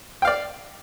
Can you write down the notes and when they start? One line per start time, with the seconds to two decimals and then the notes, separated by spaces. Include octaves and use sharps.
0.22 G5
0.25 F5
0.27 D5